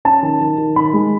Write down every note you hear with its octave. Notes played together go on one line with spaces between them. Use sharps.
C#4 A5
D#3
D#3
D#3
D#3 B5
G#3